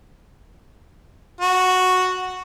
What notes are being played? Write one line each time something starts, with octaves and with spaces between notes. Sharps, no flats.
F#4